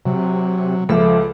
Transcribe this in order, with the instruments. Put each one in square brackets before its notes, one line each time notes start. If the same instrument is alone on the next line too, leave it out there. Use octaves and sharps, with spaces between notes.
[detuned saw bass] C3 [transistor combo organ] F#3
[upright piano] C#2 [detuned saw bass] F3 [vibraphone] A4 E5 D6